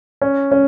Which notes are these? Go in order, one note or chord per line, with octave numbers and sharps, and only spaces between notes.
C#4
C#4